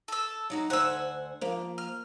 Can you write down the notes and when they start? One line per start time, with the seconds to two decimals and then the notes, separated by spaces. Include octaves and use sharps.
0.08 A4 E6
0.50 F#3 D#4 F#4
0.70 D2 C5 F#5 G#5 E6
1.41 F3 A#3
1.78 F6